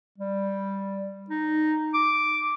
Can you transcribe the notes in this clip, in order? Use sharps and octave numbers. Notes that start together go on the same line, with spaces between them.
G3
D#4
D6